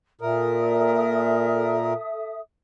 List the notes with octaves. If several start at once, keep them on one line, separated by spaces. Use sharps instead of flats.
A#2 A4 A#4 E5 D#6